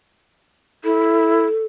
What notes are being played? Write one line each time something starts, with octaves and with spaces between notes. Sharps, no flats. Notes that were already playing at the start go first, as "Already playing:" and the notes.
E4 A4